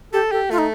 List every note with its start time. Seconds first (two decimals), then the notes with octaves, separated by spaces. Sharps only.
0.13 G4 A4
0.32 G4 A4
0.51 A3 F4
0.58 D#4